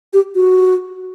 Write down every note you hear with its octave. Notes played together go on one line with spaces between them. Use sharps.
G4
F#4